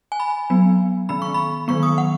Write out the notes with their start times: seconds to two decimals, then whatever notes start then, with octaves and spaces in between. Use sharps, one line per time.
0.12 G#5
0.20 B5
0.50 F#3 B3
1.09 D#3 B3 B5
1.22 C#6
1.34 B5
1.68 D#3 F#3 B3 C#6
1.83 D#6
1.98 F#5